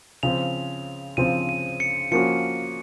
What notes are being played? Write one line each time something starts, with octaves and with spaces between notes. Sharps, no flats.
C#3 F3 C4 F7
C#3 F3 C4 D#7
D#7
C#7
F3 A#3 C#4 F#4 C#7